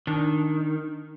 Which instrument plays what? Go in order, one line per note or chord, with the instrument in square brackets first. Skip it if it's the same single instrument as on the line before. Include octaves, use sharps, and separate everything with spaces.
[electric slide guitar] D#3 [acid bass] D4